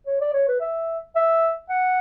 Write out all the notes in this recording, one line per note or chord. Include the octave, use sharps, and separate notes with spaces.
C#5
D5
C#5
B4
E5
E5
F#5